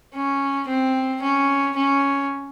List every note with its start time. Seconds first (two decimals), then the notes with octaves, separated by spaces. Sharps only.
0.14 C#4
0.68 C4
1.22 C#4
1.76 C#4